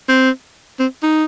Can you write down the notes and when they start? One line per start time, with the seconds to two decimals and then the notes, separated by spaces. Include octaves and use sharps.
0.09 C4
0.79 C4
1.03 D#4